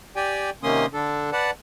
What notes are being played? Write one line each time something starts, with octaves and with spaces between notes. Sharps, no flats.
G4 D5 G5 G#5
C3 D#3 A#3 C#4 C6 D#6
D3 D4 A4
B4 D5 F#5 A5